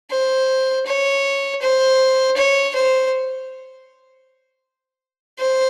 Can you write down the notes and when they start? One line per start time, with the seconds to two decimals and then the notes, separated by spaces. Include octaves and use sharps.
0.11 C5
0.86 C#5
1.62 C5
2.37 C#5
2.75 C5
5.39 C5